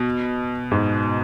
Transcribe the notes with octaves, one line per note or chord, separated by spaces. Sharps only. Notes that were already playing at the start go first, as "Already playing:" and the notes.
Already playing: B2
G#2